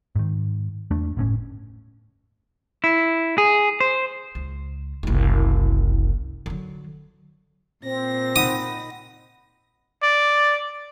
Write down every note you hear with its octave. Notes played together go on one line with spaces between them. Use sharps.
G#2 D#3
E2 A3 D4
G1 A2 C#4
E4
G#4
C5
C#2
F#1 C2
D3 F#3
A#2 C4 A#6
D#4 F#5 B5 D#6
D5